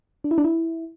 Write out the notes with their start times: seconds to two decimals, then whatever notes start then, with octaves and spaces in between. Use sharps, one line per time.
0.24 D4
0.31 E4
0.38 D4
0.44 E4